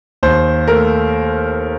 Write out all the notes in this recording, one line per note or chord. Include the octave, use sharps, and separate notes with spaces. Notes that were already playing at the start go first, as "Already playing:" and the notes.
D#2 C5
A3 A#4